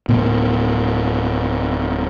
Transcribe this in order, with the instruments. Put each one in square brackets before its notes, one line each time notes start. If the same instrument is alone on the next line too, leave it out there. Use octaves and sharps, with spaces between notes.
[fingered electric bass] D1 A2 B3